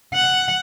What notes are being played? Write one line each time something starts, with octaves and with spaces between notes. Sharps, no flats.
F#5